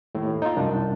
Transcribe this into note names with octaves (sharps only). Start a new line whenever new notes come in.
D#2 A2
D#4 F4
C2 F#2 D4